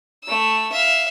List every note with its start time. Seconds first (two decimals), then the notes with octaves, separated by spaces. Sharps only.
0.24 A3 E6
0.72 E5 F5